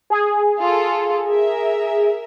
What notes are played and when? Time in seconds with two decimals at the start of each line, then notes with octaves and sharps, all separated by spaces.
0.10 G#4
0.61 F4 A4
1.27 A#4 E5